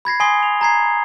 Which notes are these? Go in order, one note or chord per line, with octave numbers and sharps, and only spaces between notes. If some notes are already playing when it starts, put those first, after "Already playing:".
B5 G#6 A#6 C7
G#5 C6 D#6 A#6 C7 G7
F7
A#5 G#6 C7